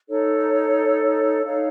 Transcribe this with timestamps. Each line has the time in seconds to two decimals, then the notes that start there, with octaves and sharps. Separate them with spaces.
0.09 D#4 A4 C#5
1.45 D#4 A4 C#5 F5